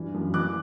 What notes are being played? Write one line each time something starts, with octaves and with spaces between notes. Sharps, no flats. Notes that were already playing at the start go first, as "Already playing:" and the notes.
Already playing: G2 E3
F#2
E3 D6 F#6